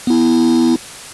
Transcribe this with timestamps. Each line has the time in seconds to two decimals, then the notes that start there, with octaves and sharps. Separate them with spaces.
0.07 B3 E4